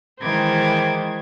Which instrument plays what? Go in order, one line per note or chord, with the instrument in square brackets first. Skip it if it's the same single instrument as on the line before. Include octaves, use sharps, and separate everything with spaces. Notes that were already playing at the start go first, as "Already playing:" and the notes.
[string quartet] D#3 E3 G#3 C5 D6 G#6